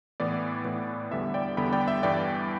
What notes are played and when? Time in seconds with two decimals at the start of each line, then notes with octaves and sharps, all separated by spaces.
0.20 A2 E3 B3 D5
0.65 A2 E3 B3
1.11 E2 D3 G3 B3 E5
1.34 D5 G5
1.57 E2 D3 G3 B3 G5 B5
1.72 D5 G5
1.88 E5
2.03 G2 E3 B3 D5 G5